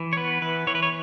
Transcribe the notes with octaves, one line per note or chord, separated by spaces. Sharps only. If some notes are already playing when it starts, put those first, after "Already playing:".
Already playing: E3
C#5
B3 B4
E3 B4
E3 C#5
B4
C#5